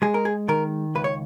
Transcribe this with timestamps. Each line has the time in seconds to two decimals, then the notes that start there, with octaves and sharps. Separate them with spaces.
0.02 G#3 G#4
0.14 A#4
0.25 G#4
0.48 D#3 A#4
0.95 C#2 B4
1.04 C#5